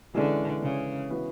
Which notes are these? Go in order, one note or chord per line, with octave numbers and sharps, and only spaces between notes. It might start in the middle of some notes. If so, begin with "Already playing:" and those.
D3 E3 G#3 C#4 G#4 D5
C#3
E3 B3 F#4 B4